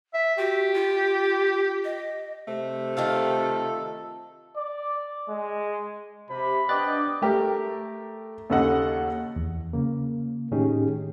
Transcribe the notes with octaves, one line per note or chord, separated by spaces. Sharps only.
E5
F#4 G4
F4
D#5
C3 A3
D#3 F4 A4 F5
D5
G#3
C3 B5
B3 D4 D5 D#5 G5 D6 F#6 A6
A3 G4 A#4
D#2 C#3 A4 D#5 F#5
E2
C#3 A#3
A2 D#3 C#4 D#4 G4 G#4